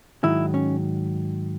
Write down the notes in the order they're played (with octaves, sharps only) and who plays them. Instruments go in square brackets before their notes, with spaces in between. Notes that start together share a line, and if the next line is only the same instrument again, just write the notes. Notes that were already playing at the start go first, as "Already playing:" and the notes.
[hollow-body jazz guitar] G#2 D#3 F#3 E4
C#4